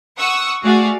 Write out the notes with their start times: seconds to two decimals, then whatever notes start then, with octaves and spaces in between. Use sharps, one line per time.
0.18 F#5 C#6 D#6 E6
0.63 A3 F#4 G#4 D5 F5 F#5